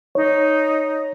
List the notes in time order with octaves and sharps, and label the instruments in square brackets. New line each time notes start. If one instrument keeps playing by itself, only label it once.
[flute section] D#4 [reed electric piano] C#5